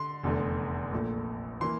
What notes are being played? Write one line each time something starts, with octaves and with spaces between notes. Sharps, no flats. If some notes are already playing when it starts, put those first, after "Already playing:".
Already playing: D3 C6
F1 E2 D3 A3
A#1 A#2 A3
E3 A#3 C6